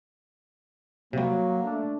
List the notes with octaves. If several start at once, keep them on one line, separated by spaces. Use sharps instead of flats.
C3 F#3 G3 A#3
A3 D4